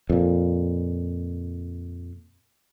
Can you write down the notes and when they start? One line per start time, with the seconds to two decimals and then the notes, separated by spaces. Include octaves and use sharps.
0.10 F2 A#2